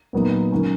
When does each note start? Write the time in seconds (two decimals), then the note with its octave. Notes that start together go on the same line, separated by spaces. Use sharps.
0.13 A#2 F#3 B3 D#4
0.52 D#3 F#3 C#4